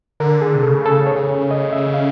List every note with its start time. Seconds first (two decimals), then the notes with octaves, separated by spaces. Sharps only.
0.20 D3 A#4
0.42 G#4
0.55 C3
0.63 C#3 A4
0.86 A4
1.07 C#5
1.51 D#5
1.73 E5
1.94 F5